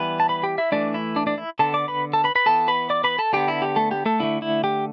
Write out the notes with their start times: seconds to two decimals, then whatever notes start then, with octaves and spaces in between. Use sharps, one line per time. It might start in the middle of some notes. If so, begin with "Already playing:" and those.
Already playing: E3 G3 B3 B4
0.20 A5
0.29 B4 B5
0.43 G4 G5
0.58 E4 E5
0.72 E3 A3 D4 D5
0.94 E4 E5
1.16 D4 D5
1.27 D4 D5
1.38 E4 E5
1.59 D3 B3 A4 A5
1.74 D5 D6
1.88 B4 B5
2.13 A4 A5
2.24 B4 B5
2.35 B4 B5
2.46 E3 B3 A4 A5
2.68 B4 B5
2.90 D5 D6
3.04 B4 B5
3.19 A4 A5
3.33 D3 B3 G4 G5
3.48 E4
3.62 G4
3.76 A3 A4
3.91 G4
4.06 A3 A4
4.20 D3 A3 E4
4.42 E4
4.64 G4